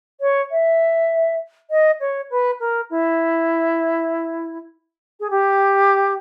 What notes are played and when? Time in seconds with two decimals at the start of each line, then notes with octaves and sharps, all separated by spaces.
0.20 C#5
0.51 E5
1.70 D#5
2.00 C#5
2.30 B4
2.60 A#4
2.90 E4
5.19 G#4
5.30 G4